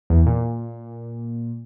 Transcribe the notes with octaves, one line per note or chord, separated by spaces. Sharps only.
E2
A#2